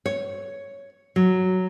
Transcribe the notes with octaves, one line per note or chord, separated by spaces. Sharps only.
C#5
F#3